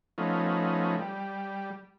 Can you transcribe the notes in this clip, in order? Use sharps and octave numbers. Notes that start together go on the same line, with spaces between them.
F3 A3 B3 C#4 D#4
G3